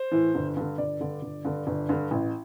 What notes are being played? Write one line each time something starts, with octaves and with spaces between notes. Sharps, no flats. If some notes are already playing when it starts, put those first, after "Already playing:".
Already playing: C5
A2 E3
G1
G2 D3
G1 D5
G2 D3
G1
G2 D3
G1
G2 D3
A1